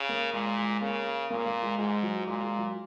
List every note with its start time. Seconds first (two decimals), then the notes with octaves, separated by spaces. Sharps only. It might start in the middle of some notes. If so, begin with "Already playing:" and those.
Already playing: C#3
0.09 A#3
0.33 A#2 G#3
0.57 G#3
0.81 C#3 A#3
1.30 A#2 A#3
1.46 A#3
1.62 G#3
1.78 G#2 G#3
2.03 F#3
2.27 A#2 G#3
2.43 G#3
2.59 F#3